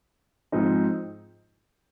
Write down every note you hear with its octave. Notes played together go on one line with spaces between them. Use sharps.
G#2 F3 C4 D#4